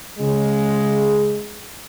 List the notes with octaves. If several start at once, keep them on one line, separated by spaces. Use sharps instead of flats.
C#3 G#3